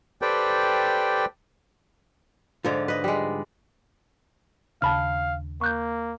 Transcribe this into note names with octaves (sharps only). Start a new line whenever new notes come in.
G4 A4 B4 C5 D5 G5
G#2 D3 F3
B4 D#5
G3 G#3
D#2 C#3 D4 F5 A5 B5 F6
A#3 C#6 F#6 G6